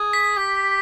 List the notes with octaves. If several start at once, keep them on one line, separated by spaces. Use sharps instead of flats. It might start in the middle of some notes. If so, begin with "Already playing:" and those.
Already playing: G#4
B6
G4